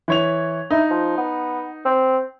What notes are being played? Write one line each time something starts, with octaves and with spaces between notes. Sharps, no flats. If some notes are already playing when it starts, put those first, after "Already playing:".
E3 C#5 F7
D#4 E4
F3
B3
C4